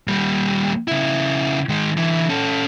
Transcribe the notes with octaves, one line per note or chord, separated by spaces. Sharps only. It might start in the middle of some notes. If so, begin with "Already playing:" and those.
D#2 G3
C#3 E4
D#3 G#3
D3 E3
C#4 A4